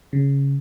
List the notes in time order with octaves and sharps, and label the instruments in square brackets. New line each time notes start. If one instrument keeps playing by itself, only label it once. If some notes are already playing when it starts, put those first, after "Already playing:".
[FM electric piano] C#3